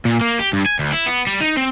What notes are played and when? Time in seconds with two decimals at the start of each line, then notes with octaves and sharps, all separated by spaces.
0.05 A#2
0.21 A#3
0.39 G4
0.53 G2
0.66 G#5
0.79 D2
0.93 E4
1.06 B3
1.27 G3
1.40 D#4
1.57 C4